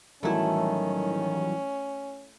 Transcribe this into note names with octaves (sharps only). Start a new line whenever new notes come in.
A2 D#3 E3 F#3 G3 A3 C#4 E4